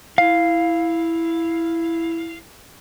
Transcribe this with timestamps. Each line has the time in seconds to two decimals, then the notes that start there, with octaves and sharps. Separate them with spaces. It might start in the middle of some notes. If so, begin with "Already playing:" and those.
0.18 E4 F5